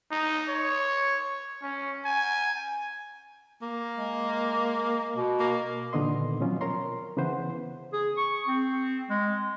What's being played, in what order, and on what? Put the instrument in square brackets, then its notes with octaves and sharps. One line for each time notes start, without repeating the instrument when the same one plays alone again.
[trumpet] D#4
C#5
C#4
G#5
[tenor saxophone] A#3
[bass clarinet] G#3
B2
[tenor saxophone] A#3
[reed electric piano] A#2 D3 D#3 B3 D#5 C6
B2 F3 F#3 C4 C#4 F4
A#4 C#5 A#5 C6
C#3 E3 B3 B4 C5 F#5
[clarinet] G#4
C#6
C4
G#3